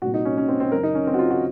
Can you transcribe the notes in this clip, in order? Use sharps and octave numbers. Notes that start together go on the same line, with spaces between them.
C2 A#2 F#4
D#4
C#4
C#4
C4
C4
F#2 C#3 A#4
D#4
C#4
C4
F#4
F4
F#4